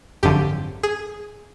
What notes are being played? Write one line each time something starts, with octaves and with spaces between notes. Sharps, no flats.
G#1 F#2 D3 F3 G4
G#4